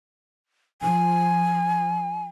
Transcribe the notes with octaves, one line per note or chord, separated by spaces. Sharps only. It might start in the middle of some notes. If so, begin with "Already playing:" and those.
F3 G#5